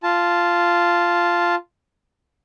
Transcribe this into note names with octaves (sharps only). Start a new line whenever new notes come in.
F4 A5